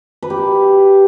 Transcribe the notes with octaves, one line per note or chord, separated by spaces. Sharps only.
B4
G4
A5